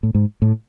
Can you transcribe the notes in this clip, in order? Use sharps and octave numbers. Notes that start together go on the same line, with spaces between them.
A2
G#2
A2